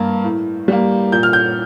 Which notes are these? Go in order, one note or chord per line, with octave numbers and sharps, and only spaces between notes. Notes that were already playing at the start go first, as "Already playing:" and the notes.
Already playing: G2 A#3
A2
G3 A#3
A#2 G6
F6
G6